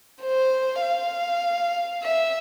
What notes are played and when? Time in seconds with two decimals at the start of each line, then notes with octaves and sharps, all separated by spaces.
0.22 C5
0.82 F5
2.02 E5